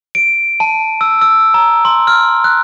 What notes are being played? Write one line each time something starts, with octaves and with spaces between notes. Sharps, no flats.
D7
A5
E6
E6
A#5
C6
F6
F#6